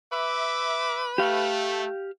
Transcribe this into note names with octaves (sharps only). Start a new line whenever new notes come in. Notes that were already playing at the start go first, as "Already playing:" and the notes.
B4 E5 D6
A3 G4 F5